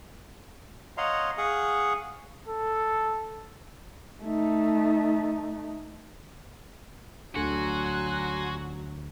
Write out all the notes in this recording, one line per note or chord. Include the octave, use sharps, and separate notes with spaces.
C#5 D#5 F5 F#5 A#5 C6
G#4 F5 F#5 C#6 D#6
A4
A3 D#4
D2 D3 F#3 F#4 G#5 C6 C#7